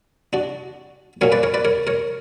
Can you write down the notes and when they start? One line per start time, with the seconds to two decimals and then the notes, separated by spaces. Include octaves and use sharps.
0.33 D4 F#4
1.21 A#2 F#3 C#4 A#4 C#5
1.32 B4 D5
1.43 A#4 C#5
1.54 B4 D5
1.65 A#4 C#5
1.87 A#4 C#5